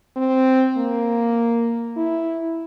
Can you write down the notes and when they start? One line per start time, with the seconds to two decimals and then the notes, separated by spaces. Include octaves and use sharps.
0.16 C4
0.77 A#3
1.96 E4